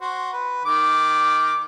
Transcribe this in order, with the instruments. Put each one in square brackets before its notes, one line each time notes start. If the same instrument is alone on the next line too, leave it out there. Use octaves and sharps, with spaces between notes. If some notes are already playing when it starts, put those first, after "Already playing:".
[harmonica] F#4 C5
B4
D#3 D6